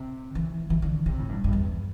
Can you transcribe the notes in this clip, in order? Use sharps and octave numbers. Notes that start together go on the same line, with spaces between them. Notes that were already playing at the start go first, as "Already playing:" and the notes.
Already playing: C3
E3
E3
D3
C3
A2
G2
G2
E2